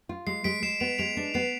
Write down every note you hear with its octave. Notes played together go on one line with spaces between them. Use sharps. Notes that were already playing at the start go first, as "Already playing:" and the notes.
F4
G#3 C7
G#3 B6 D7
G#3 C7 E7
B3 D7 F7
G#3 D7 F7
D4
B3 C7 E7